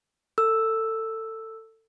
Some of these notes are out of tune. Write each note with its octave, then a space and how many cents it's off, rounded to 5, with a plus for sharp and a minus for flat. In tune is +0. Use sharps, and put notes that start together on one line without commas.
A4 +25 E6 +0